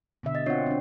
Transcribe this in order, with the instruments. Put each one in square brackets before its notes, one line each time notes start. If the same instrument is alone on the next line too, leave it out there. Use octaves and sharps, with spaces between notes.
[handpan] B2 D3 E5
[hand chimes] D#5 A6
[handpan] C4 F4 F#5 [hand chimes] D4 C#5 C7
[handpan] C4 D4